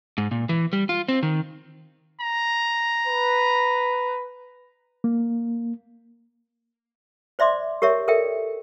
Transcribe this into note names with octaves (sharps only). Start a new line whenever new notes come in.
G#2
A#2
E3
G3
F4
C4
D#3
A#5
B4
A#3
C5 D5 E5 C6 D6
G4 A#4 C#5 E5
A4 A#4 D5 E5 G5